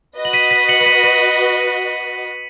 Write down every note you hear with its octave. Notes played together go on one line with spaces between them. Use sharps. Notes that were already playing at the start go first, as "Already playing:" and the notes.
F#4 B4 D#5
F#7
B6 D#7
B6 D#7
C#7 F#7
F#7
B6 D#7
B6 D#7